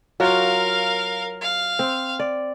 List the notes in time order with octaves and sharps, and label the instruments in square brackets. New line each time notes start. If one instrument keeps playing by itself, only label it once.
[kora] F#3 F4 F#4 [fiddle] A#4 F5
[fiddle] F5
[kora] C4
D5